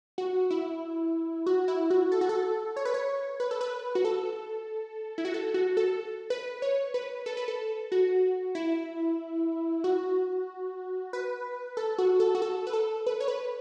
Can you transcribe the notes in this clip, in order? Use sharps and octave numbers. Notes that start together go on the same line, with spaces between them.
F#4
E4
F#4
E4
F#4
A4
F#4
A4
C#5
B4
C#5
B4
A4
B4
F#4
A4
E4
F#4
A4
F#4
A4
B4
C#5
B4
A4
B4
A4
F#4
E4
F#4
B4
A4
F#4
A4
F#4
A4
B4
A4
B4
C#5
B4